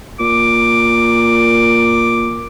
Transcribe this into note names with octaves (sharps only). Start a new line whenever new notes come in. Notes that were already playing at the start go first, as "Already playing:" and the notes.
A#2 D6